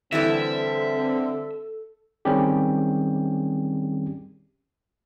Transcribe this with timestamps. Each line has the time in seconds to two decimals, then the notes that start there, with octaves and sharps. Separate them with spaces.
0.12 D3 E3 G3 C4 E4 A4 E5
2.25 D#3 G3 C4 C#4 G4 G#4